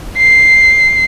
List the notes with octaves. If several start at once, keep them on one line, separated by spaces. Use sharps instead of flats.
C7